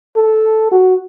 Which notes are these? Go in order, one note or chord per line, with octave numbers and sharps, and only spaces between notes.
A4
F#4